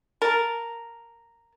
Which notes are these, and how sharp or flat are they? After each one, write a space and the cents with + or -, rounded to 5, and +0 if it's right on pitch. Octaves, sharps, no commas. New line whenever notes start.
A#4 -5 A5 -5